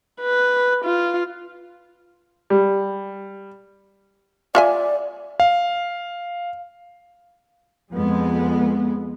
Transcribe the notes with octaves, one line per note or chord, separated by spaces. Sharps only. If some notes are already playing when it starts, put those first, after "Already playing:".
B4
F4
G3
F4 D5 E5 G#5
F5
F2 G#3 B3